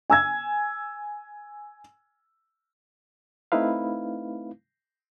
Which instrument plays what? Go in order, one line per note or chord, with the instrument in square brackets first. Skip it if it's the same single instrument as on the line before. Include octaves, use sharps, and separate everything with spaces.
[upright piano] G#5 E6 G#6
[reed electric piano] A3 C4 D#4 E4 B4 F5